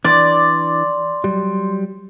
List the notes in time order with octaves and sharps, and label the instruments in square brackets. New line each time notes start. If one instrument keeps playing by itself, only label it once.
[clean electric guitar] E3 D4 [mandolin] D5 [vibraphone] C6
[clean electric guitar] F#3 G3